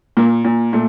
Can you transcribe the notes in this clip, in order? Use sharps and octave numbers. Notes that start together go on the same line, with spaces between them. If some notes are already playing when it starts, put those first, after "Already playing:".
A#2 A#3
A#2
A#2 A3